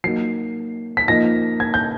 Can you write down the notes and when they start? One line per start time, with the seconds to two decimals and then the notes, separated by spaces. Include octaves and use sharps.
0.04 F#3 A#3 D#4 C7
0.97 B6
1.08 F3 A#3 D#4 A#6
1.60 G#6
1.74 G6